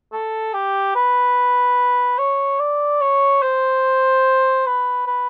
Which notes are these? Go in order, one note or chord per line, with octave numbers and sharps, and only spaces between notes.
A4
G4
B4
C#5
D5
C#5
C5
B4
B4